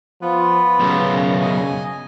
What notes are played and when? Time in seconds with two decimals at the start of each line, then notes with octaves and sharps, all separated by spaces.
0.22 F3 B3 F4 B4
0.80 B1 F#2 C#3
1.41 D#5 G#5